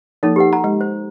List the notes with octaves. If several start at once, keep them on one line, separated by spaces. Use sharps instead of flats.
F3 A#3 D#4 A4
G4 B4 F#5
F#5 A#5
G#3
C5